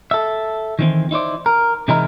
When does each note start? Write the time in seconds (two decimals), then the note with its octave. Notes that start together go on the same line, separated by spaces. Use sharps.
0.11 A4 E5
0.79 D#3 E3 C4
1.11 D#4 E4 C5 D5
1.46 A#4
1.88 C3 E3 G#3 D#4 E4 A#4